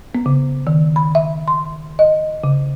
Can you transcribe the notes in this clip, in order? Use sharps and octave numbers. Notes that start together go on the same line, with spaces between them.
B3
C#3
D#3
B5
E5
C6
D#5
C#3